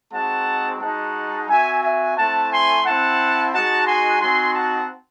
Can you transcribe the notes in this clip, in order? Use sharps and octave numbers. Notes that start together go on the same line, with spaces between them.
G#3 C4 D#4 F#4 F#5 A5
G#3 D#4 F#4 F#5 A5
C4 F#4 E5 G#5
E5 G#5
A3 C4 E4 F#5 A5
G#5 C6
C4 E4 F#5 A5
G#3 D#4 F#4 F#5 A5
G#5 C6
C4 D#4 F#4 G#5 C6
F#5 A5